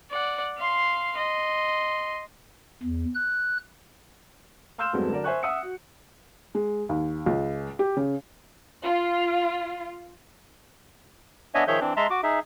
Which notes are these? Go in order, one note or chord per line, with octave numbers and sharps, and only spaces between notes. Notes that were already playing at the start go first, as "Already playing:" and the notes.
D5 F#5
F5 C6
D#5 C6
E2
F#6
F5 C6 E6 F6 G6 E7
E2 G2 F#3 G#3 A3 C4
D3 F#3 A#4 D5
C5 E5 G#5 C#6 F#6
E5 F#5 D#6 E6 C#7
F#4
G#3
D#2
C#2
G4
C#3
F4
B3 D4 C#5 D#5 E5 G#5
D#3 F3 G#4 C#5 E5 G6
E3 C4 D4
G#3 E5 A5 A#5 C6
F#4 D6
D#4 G#4 E5